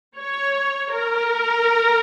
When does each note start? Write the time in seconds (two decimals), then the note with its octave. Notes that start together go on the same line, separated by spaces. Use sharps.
0.18 C#5
0.92 A#4